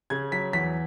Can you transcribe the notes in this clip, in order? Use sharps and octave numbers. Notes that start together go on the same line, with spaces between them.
C#3 G#6
F#3 B6
E2 B6